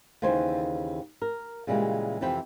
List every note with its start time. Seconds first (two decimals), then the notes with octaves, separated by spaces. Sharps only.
0.22 D#2 C#3 E3 C5 G#5
1.22 A#4
1.67 A#2 C#3 E3 G3 G#3
2.21 F2 C3 E3 E4 G5